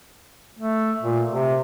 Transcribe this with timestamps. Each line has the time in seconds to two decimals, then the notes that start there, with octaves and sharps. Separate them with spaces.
0.59 A3
1.02 A#2
1.31 C3